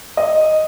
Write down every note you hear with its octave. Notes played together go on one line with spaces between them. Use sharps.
D#5